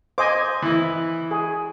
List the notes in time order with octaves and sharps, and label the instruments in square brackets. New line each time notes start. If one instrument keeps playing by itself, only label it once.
[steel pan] C5 D#5 G#5 [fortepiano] D6
[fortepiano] E3 E4
[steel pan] G#4